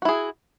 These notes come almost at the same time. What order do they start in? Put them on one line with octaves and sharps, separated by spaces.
F#4 E4 G#4